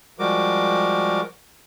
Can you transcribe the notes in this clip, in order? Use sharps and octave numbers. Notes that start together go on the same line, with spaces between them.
F3 G3 G#3 F#4 A#4 D6